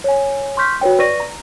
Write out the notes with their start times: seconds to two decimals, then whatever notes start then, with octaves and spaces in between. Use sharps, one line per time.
0.04 C#5 G#5
0.57 C6 C#6 F6 G6 B6
0.81 F#4 B4 C#5 G5
0.99 B4 D5 C#6 A#6 D#7
1.20 A#5